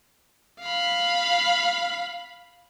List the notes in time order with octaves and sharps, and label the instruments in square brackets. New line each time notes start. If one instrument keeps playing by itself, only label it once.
[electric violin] F5 B5